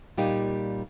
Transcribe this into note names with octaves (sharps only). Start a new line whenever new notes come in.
A#2 G3 A#3 D#4 G4